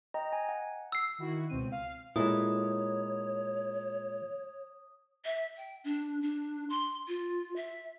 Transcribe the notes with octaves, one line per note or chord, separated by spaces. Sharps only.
D#5 G5 A#5
G#5
F#5
E6 C7
D#3 E4 F#4
C#2 B2 C4 D#7
F5
A#2 G#3 E4 A4 C#5 D#6
E5
G5
D4
D4
C6
F4
E5